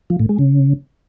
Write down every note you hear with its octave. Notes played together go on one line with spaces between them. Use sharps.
F3
A2
G#3
C#3